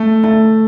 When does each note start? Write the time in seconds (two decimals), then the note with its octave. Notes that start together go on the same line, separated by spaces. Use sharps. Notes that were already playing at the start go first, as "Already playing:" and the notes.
Already playing: A3
0.24 A3